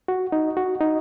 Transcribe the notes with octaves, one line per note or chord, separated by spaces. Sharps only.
F#4
D#4
F#4
D#4